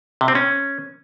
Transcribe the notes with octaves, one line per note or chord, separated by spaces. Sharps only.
C3
C4
C#4